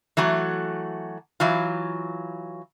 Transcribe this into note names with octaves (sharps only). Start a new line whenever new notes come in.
E3 F#3 A3 F#4
E3 F#3 F4